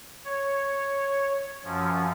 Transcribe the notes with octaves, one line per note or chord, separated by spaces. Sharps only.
C#5
F#2 F3 C#4